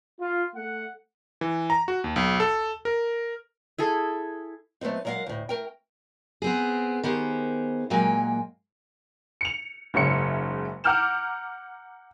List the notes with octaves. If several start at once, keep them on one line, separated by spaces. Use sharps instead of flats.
F4
A3 F#5
E3
A#5
F#4
D#2
B1
A4
A#4
E4 G#4 A4
F#3 A3 B3 C4 D#4
F#3 G#3 A#4 D#5 F5 F#5
D2 A2
A3 A#4 G5
B3 C4 G#4
D#3 B3 G4 G#4 C5
A#2 F#3 G#3 A#3 G5 G#5
C#7 F7
F#1 G#2 C#3 C#5 E5 C#7
F#5 A#5 D6 F6 G6 E7